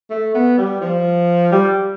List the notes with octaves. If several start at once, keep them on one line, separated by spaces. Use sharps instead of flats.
A3
B3
G3
F3
G3